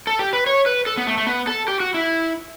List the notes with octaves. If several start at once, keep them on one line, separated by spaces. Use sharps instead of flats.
A4
G4
B4
C#5
B4
A4
B3
A3
A3
B3
A4
G4
F#4
E4